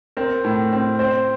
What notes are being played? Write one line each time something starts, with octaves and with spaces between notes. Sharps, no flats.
C4 A#4
A2
C4
C4 C5